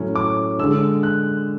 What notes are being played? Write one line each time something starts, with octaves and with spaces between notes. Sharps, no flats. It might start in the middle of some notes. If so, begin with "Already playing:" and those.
Already playing: A2 F#3 C#4
D6
D3 G#3 D4 E6
F#6